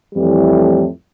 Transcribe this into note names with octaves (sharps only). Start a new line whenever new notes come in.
F2 A2 E3 G3